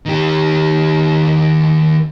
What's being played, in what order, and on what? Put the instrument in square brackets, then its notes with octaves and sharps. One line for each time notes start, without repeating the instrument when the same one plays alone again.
[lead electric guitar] D#3 G4